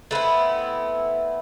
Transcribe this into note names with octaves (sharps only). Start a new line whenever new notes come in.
A3 B3 C4 E4